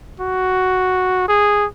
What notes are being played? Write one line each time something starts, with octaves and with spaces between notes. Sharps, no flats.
F#4
G#4